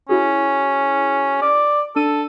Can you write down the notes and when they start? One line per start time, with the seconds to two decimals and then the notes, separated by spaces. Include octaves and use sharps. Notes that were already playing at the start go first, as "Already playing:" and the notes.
0.09 C#4 E4 F#4 G#4
1.42 D5
1.96 D4 A4 E6 D#7